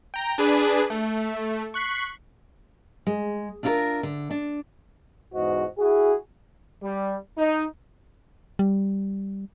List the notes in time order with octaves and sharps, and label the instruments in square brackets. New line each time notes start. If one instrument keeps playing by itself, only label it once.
[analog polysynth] G5 A#5
D4 G#4 B4
A3
C#6 F#6 B6 C7
[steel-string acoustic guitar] G#3
D4 E4 F4 G#4 A#4 E5
D3
D4
[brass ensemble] E2 G#2 F#4 C5 D#5
E4 F#4 G#4
G3
D#4
[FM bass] G3